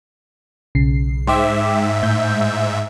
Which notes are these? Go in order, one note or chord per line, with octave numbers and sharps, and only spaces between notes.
B1 C#3 C7
G#2 C5 E5 G5 D6
A2 G6